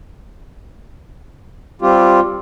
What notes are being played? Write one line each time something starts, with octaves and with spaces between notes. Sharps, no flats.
G3 C4 F4 G4